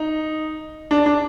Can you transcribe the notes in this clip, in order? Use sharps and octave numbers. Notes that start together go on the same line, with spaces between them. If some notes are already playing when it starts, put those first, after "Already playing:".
Already playing: D#4
D4
D4